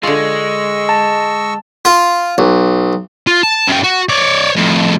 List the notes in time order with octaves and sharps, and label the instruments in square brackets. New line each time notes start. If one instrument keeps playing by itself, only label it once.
[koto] D3 F4 [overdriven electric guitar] G#3 [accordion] D#5 C#6 E6
[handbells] A5
[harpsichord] F4
B1
[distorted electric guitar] F4
A5
F#2 G5
F#4
C#5 D5
F2 A2